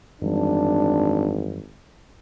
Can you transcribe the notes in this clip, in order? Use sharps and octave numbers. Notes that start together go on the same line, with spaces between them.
G#1 F#2 E3 G3 D4